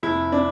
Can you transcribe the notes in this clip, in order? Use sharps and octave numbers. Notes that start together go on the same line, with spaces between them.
F1 E4
D4